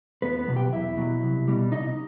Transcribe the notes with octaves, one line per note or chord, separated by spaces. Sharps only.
E2 B3 B4
B3 B4
B2 F#3
G4 G5
E2 E4 E5
B2 F#3
C2
B2 G3
C2 D#4 D#5